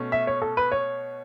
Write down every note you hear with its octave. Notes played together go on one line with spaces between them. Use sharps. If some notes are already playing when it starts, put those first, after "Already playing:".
Already playing: B2 A3 C#4
E5
C#5
A4
B4
C#5